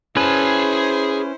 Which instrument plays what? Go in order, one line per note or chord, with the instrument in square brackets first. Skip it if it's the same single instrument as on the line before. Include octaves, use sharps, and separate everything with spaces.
[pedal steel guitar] C#4 B4 [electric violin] E4 C5 [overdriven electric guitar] G#4 A5